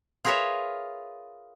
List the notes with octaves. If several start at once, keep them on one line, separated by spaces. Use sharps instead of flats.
F4 G#4 A#4 B4 C#5 E5